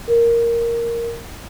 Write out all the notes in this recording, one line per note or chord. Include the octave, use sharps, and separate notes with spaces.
A#4